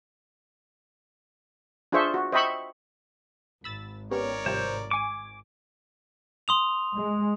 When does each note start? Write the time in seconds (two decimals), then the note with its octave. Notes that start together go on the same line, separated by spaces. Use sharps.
1.92 D4 F4 G#4 C5 E5 C#6
2.14 F#4
2.32 C5 D#5 E5 G5 B5 C#6
3.64 G#1 B5 E6 A6
4.11 B3 C#4 G4 A#4 C#5 D5
4.46 C3 F3 G3 C5
4.91 G#5 C#6 D6
6.48 C6 D#6 F7
6.95 G#3